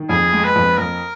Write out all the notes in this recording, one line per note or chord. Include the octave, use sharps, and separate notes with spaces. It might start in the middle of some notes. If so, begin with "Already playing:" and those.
Already playing: D#3
F2 G#4
G#3
B4
F2
F2 A#4